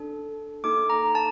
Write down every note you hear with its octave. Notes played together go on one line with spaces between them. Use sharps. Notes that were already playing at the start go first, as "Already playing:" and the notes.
Already playing: D4 A4
A#3 D#4 A4 D6
A#5
A5